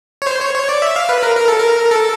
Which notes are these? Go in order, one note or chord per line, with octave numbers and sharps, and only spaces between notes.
C#5
C5
C#5
C#5
D5
E5
F5
B4
A#4
A#4
A4
A#4
A4